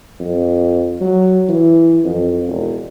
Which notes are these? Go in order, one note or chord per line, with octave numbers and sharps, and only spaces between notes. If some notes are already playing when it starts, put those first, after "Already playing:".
F2
F#3
E3
F2
E1